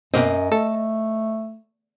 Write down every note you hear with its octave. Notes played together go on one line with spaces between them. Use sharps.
F#2 B2 A#3 C4 D#5
A3 A4